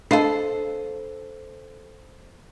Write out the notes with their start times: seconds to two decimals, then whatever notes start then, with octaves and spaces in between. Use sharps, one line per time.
0.11 D4 A4 C5 D#5 F5